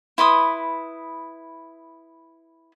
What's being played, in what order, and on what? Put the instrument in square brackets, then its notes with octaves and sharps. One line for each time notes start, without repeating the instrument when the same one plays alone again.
[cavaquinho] E4 B4 C6 D#6